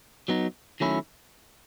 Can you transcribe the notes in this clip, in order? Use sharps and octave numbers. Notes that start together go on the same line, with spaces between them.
F#3 B3 D#4
D#3 F#3 A3 C#4 E4